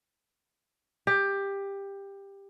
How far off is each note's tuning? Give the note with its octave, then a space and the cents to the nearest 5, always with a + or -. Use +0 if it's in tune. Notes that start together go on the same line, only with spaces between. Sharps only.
G4 +15